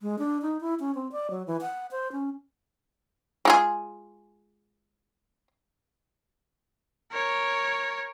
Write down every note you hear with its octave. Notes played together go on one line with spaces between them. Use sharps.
G#3
D4
D#4
E4
C#4
C4
D5
F#3
E3
F#5
C5
C#4
G#3 F4 G#4
A#4 C#5